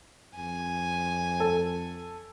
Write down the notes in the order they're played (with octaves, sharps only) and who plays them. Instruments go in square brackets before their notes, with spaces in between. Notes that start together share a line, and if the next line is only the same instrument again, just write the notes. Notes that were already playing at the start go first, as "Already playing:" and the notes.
[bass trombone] F2 [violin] G#5
[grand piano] A4